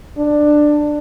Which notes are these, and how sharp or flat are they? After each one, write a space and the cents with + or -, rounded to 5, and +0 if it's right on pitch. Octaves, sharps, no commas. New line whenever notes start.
D4 +15